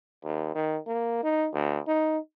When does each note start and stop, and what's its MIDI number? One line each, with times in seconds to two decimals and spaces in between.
0.24 0.50 39
0.55 0.79 51
0.87 1.19 58
1.23 1.48 63
1.53 1.79 38
1.87 2.18 63